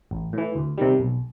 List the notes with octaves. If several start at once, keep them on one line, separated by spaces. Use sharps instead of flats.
A1
A2 E3
D2
C3 D#3 G3
B1